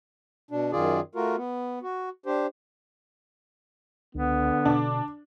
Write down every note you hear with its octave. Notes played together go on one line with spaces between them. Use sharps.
B2 D4
F#2 D#3 F4 G#4 D5
A3 F4 F#4 A#4
B3
F#4
D4 G4 C5
C#2 D3 B3
B2 D4 D6